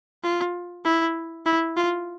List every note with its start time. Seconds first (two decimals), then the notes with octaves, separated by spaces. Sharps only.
0.23 F4
0.85 E4
1.46 E4
1.77 F4